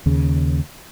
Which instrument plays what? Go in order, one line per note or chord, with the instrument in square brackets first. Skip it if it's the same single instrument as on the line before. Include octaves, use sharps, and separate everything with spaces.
[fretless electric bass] D#2 C#3